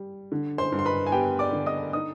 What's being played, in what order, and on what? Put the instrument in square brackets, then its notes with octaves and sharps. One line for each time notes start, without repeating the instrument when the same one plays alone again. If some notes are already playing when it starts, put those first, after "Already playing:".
Already playing: [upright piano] G3
D3
C5 C6
G2
C6
B4 B5
G#5
B3 G4 G5
D5 D6
D3
D#5 D#6
D#4 D#5 D#6